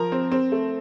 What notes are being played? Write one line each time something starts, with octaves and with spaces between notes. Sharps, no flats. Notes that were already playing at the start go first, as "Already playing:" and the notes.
Already playing: F3 A#4 A#5
C4
C4
A3